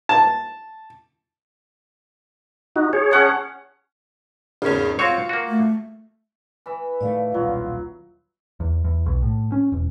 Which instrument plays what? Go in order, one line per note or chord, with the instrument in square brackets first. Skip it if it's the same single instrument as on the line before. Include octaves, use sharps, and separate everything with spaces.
[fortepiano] A5
[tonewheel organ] D#4 F#4
G#4 C#5
[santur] C#4 F#5 A5
[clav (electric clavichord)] G#1 C#4 [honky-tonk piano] E2 C#3
[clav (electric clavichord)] C4 F#4 C#5 [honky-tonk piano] F4 C#6
[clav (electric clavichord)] A#3 F#4
[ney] A3
[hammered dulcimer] E3 E5
[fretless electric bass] A2 D#3 A3 [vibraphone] D5 F5
[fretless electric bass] D#1 B1 [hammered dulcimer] F#3 [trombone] F4
[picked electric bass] E2
E2
B1
A2
C#4
E1